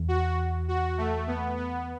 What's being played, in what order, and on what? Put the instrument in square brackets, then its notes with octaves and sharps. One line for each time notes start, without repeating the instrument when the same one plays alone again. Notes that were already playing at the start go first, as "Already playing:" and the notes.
Already playing: [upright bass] E2
[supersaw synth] F#4
F#4
A3
B3
B3